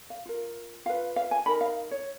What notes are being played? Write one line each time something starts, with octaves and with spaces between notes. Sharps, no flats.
F5
F4 A#4
F4 B4 F5
F5
G#5
D#4 A#4 B5
F5
C#5